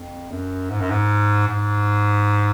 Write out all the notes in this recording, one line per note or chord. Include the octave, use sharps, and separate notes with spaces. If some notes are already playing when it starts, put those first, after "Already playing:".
Already playing: F2
F#2
G#2
F#2
G#2
G#2